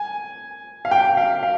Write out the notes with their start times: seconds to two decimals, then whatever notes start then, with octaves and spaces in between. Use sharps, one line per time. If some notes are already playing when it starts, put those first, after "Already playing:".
Already playing: G#5
0.85 F5
0.91 G5
1.17 F5
1.43 F5